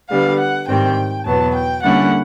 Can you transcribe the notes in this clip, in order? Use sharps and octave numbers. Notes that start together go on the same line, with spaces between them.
D3 G3 B3 F5
F#5
G#2 D#3 G3 C4 G5
E2 B2 F#3 B3 A5
G5
D3 G3 A#3 C#4 E4 F#5